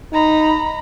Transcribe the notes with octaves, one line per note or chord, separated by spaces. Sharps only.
D#4 A#5 B5